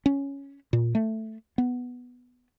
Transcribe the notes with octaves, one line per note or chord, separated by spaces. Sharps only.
C#4
A#2
A3
B3